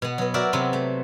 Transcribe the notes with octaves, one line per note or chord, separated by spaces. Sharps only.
B2 B3
F#3 B3
F#4 A#4 D5 E5
C3 F#3 B3 C4
A3